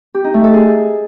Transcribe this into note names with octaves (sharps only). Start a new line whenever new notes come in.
G4
D#4
A3
A4
G#4